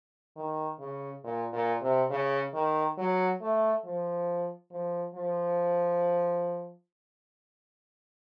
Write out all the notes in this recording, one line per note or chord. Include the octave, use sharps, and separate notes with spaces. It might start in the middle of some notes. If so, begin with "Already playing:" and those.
D#3
C#3
A#2
A#2
C3
C#3
D#3
F#3
A3
F3
F3
F3